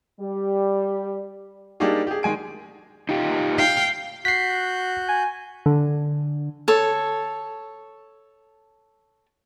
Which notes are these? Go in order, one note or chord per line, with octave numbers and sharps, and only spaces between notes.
G3
G3 A#3 D4 D#4 G4 G#4
G4 G#4
D#3 G#3 G#5 D7
D#4 F4 G4
F5 G5
F#4 F#6 G6 B6 C7
G#5
D3
A4 C#5